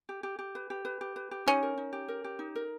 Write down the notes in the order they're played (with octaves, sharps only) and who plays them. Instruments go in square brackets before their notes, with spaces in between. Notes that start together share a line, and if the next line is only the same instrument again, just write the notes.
[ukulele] G4
G4
G4
B4
G4
B4
G4
B4
G4
[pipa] C#4 [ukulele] D#4
[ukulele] A#4
D#4
G4
A#4
G4
D#4
A#4